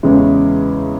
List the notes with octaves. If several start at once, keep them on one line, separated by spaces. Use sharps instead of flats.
E2 C#3 G#3 C#4 E4